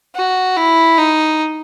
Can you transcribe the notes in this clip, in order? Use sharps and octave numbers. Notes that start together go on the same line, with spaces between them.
F#4
E4
D#4